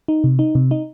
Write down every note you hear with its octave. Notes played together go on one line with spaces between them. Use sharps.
D#4
C3
D#4
C3
D#4